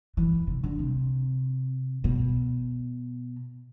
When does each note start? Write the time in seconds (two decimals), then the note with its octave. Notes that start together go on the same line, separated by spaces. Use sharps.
0.17 E3
0.47 C3
0.63 D3
0.79 C3
2.04 B2